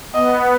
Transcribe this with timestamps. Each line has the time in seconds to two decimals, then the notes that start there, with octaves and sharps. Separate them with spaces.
0.14 B3 D#5